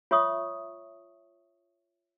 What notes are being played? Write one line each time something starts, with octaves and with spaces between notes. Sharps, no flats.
F4 C#5 E5 C#6 D#6